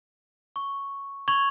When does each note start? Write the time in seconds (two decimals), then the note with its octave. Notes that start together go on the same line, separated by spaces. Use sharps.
0.56 C#6
1.28 C#6 G#6 F7 F#7